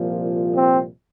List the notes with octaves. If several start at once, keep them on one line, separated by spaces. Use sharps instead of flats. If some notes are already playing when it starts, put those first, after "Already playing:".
Already playing: C2 A#2 F3
C4